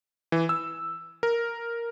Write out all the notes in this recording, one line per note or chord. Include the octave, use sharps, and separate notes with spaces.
E3
E6
A#4